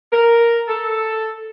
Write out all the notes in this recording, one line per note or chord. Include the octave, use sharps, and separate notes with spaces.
A#4
A4